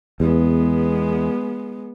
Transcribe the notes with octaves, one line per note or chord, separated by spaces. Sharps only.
E2 G#3 B3